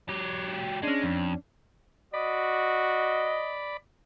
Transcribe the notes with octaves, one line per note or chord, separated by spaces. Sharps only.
F#3 G4
G#3 C#4 D4
F2
F#4 D5 D#5 B5